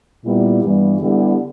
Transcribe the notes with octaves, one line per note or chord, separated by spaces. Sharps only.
A#2 G3 B3 E4 G4
G2 E3 G3 B3
D3 G3 B3 E4 G4